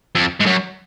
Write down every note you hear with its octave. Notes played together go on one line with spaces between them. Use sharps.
F2
G#2
F#2